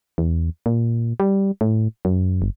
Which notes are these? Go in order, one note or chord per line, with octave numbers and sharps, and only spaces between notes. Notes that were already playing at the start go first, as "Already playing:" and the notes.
E2
A#2
G3
A2
F#2
G1